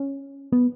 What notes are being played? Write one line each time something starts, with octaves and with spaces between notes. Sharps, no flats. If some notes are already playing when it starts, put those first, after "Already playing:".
Already playing: C#4
B3